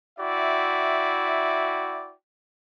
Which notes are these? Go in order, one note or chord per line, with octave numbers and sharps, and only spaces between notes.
E4 F#4 D5 E5 G5